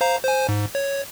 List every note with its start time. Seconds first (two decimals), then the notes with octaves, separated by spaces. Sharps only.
0.01 C5 F5 A#5
0.25 C5 G#5
0.49 G#2
0.75 C#5